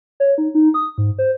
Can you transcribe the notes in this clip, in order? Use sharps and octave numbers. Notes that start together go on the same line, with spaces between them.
C#5
D#4
D#4
D#6
G#2
C5